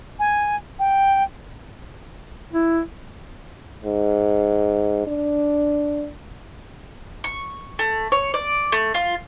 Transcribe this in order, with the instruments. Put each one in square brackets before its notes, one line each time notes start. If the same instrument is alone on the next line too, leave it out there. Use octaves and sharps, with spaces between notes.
[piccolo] G#5
G5
[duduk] E4
[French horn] G#2
D4
[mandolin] C#6
A3
C#5
D5
A3
F4